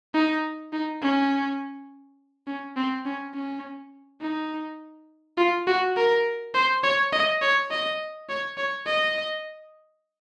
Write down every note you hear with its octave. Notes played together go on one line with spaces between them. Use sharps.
D#4
D#4
C#4
C#4
C4
C#4
C#4
D#4
F4
F#4
A#4
C5
C#5
D#5
C#5
D#5
C#5
C#5
D#5